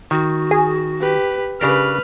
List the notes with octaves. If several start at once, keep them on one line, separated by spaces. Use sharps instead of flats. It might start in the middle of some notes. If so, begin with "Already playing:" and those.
D#3 F#4
G#4
G4 B4
C#3 D4 G4 A#4 B4 F6